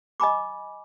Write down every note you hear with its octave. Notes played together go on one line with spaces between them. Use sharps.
D#5 G#5 B5 D6